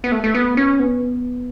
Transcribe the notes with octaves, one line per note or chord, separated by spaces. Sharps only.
B3
A3
A3
B3
C#4
B3